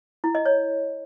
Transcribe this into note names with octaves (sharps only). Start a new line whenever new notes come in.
E4
D#5
C#5